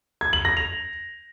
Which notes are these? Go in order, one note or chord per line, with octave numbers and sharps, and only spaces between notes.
G#6
F#7
A#6
F7